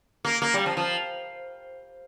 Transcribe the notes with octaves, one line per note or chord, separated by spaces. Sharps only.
A#3
A#3
G3
F3
F3